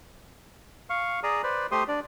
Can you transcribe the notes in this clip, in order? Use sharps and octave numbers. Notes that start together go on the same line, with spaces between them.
F5 C#6
G#4 D5 A#5 D#6
B4 C5 D5
A3 G4 C5 C6 D#6
D4 D5